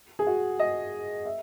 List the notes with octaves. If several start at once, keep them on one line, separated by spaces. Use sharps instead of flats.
G#4
F#4
D#5
E5